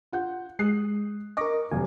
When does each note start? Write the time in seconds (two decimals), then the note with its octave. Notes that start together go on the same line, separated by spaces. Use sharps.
0.12 F4 F#5 G6
0.59 G#3 D#6 F#6 C7
1.37 A#4 D#5 C#6 D6 A#6
1.71 F1 F#2 C3 G#5